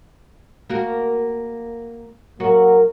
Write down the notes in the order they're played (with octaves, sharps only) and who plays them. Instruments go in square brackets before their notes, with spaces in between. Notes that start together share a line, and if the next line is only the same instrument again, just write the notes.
[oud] A#3 F#4 A#4
[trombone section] F#3 A#3 A#4 [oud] F#4